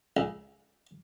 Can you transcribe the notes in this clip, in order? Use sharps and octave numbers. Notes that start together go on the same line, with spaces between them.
C#2